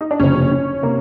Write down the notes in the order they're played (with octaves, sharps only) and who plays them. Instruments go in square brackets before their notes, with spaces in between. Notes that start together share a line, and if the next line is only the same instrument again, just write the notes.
[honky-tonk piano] D#4
D4
[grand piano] F#1 F2 C3 [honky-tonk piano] C#4
[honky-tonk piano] C#4
[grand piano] C3 [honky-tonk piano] A#3